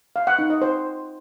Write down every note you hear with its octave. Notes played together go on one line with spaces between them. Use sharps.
F5
F#5
D#4
D#5
C5